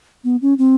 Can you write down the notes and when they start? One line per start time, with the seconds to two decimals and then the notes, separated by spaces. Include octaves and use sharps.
0.24 B3
0.42 C#4
0.58 C4